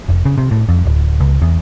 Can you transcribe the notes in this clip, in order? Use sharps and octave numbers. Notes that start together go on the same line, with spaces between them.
F1
C#3
C3
A2
F2
D1
C#2
E2